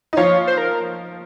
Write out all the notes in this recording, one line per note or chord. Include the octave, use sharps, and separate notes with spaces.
D#4
F3 F4 C#5
C5
A#4